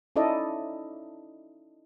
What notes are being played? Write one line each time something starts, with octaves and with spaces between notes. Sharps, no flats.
C#4 D#4 E4 A4 D5 D#5